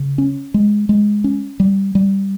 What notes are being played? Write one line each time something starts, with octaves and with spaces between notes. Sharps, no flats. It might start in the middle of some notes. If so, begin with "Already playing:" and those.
Already playing: C#3
C#4
G#3
G#3
C#4
G3
G3